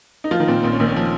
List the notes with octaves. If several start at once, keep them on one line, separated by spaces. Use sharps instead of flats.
D#4
F3 F4
D#3 D#4
A#2 C4
A#1 C4
C#4
A#1 D#3 D#4
C#4
F3